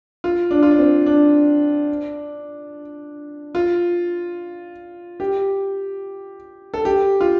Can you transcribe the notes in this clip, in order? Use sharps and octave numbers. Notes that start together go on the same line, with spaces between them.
F4
D4
F4
D4
C4
D4
F4
G4
A4
G4
F4